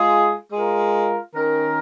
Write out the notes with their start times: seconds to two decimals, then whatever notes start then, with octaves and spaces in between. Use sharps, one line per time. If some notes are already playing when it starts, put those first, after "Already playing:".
Already playing: G#3 F4 G#4
0.52 G#3 F4 A#4
1.34 D#3 C#4 A#4